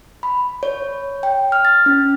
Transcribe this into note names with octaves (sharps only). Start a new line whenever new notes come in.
B5
C#5
G5
F6
A6
C#4